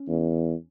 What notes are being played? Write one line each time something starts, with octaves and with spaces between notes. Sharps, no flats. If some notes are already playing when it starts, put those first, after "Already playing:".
Already playing: C#4
E2